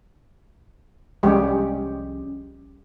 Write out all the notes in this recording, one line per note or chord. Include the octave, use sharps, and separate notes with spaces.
C2 F3 G3 G#3 C#4 G4